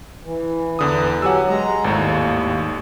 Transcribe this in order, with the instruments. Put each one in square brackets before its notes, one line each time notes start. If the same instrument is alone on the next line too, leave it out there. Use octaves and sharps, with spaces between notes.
[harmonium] E3
[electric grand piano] E2 D3 D#6
[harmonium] F#3 G4 [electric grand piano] F#5 G#5 E6
[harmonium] G#3 A#5
[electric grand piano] G#1 A2 [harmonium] D#2